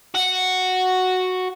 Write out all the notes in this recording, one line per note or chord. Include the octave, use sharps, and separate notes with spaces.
F#4